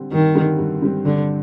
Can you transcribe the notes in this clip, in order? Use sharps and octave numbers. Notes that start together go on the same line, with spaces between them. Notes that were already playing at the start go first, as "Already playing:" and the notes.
Already playing: D3 G3 C4
G2 D#3
D3 G3 C4
G2
D3 G3 C4
G2 D3